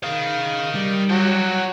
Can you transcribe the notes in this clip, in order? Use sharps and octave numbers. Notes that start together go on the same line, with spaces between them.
D#3 G#4 F5
G3
F#3 F#4 G5